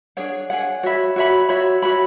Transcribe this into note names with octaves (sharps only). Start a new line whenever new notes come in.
D4 G#4 C#5 F#5
D4 G#4 C#5 F#5
F#4 C#5 E5 B5
F#4 C#5 E5 B5
F#4 C#5 E5 B5
F#4 C#5 E5 B5